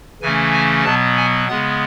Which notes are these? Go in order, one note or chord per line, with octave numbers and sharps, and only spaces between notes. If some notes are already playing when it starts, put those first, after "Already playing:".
C#3 E3 A3 C#4 G#5
G#5
B2 F#3 B3 A5
G#5
C#3 G#3 B3 F#5